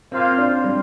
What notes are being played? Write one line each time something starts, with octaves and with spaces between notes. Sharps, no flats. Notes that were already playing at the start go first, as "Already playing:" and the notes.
A#3 C4 F4 C5 F5
D4
G3